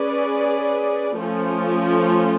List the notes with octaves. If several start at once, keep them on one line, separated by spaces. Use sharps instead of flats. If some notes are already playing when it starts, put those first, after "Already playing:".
Already playing: C#4 G#4 B4 D5
F3 A3 C#4 F4